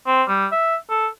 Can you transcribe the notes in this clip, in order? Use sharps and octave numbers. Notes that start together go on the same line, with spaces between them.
C4
G3
E5
A4